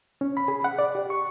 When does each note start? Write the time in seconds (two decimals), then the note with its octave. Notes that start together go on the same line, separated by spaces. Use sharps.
0.21 C#4
0.37 B5
0.48 G#4
0.64 F#5
0.79 D5
0.95 G4
1.10 C#6